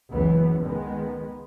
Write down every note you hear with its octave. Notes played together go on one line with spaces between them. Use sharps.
F#1 C#2 E3 B3
D#3 G#3 B3